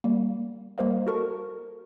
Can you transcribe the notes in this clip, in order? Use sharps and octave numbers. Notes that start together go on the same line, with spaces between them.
G3 A#3
G3 A#3 A#4 C5 D#5 F5
F#4 A4 A#4 A5 C#6